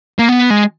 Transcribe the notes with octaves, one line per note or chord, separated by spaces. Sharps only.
A#3
B3
G#3